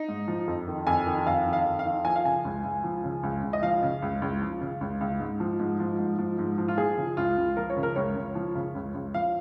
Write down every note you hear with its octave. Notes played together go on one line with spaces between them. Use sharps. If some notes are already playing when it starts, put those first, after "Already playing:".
Already playing: D#4
G#2
F3
F2
D#3
F2 G#5
D#3
F2 F5
D#3
F5
F2
F5
D#3
F3 G#5
F5
C#3 G#5
C#2
C#2
F3
C#3
C#2
C#2
D#5
F3 F5
C#3
C#2
C#2
F3
C#3
C#2
C#2
G#2
F3
G#2
F3
G#2
F3
G#2
F3
F4
F3 G#4
C#3
C#2 F4
C#2
F3 A#4
C#5
C#3
A#4
C#2 C#5
C#2
F3
C#3
C#2
C#2
F3 F5